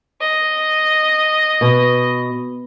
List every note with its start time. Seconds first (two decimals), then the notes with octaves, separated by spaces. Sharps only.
0.21 D#5
1.61 B2